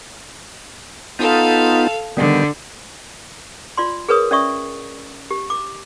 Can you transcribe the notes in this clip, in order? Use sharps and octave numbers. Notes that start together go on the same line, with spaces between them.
B3 D#4 F4 A4 F5
D3 D#3 G3 B3
F4 D5 C6
G#4 A#4 B4 C#5 D#6
C#4 D5 E5 C#6 D#6
G4
D6